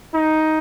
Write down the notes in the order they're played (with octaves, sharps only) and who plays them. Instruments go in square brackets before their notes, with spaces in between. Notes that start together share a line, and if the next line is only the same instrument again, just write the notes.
[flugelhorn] D#4